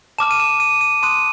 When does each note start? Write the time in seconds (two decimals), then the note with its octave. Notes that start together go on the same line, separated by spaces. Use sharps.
0.18 A5 D6 F6 E7
0.31 D#7
0.40 E7
0.60 D#7
0.81 D#7
1.02 A5 C6 D#6 F#6 D#7